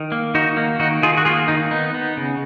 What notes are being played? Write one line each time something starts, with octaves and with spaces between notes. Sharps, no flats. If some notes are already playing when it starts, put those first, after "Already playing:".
Already playing: D#3
A#3
D#3 D#4 F#4
A#3
D#3 D#4 F#4
D#3 F4 G#4
F#4
A#3 F4 G#4
D#3 D#4
B3 D#4
B3
C#3